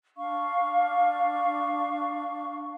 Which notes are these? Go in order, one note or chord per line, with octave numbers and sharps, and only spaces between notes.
D4 F5 C#6